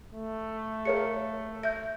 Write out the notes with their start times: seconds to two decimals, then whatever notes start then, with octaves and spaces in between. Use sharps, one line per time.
0.12 A3
0.85 G#4 A#4 C#5 F5 C#7
1.63 E5 G6 A#6